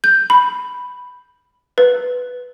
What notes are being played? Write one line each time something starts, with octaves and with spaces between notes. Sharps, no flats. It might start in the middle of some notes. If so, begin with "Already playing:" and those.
G6
B5
B4